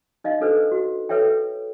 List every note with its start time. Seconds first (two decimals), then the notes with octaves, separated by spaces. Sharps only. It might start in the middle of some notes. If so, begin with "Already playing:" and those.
0.24 D#4 D#5 F5
0.41 D4 A4 B4 C5
0.71 F#4
1.09 A4 B4 C#5 E5 G5